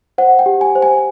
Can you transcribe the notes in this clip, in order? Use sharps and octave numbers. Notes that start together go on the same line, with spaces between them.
C5 F#5
G5
G4
G#5
C5
G#5